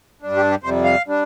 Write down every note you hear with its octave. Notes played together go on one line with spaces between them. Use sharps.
G2 G3 D4
G4
G4
F2 C3 G3 C5
F5
G3 D4